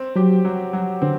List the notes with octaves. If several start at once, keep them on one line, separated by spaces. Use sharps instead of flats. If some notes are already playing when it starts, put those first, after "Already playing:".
Already playing: C4
F#3 G4
F#3
F#3
D3 C4